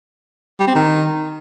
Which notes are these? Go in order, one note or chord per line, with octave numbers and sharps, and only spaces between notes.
G3
C4
D#3